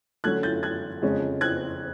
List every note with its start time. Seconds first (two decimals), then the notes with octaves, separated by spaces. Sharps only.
0.24 D3 F#3 A3 C#4 F#6 G#6
0.43 G6 A6
0.63 F#6 G#6
1.02 F2 C#3 F3 G#3 C#4
1.41 F#6 G#6